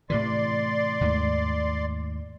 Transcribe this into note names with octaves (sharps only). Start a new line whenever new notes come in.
A2 C3 E3 D5 C6
D#2 G#2 A3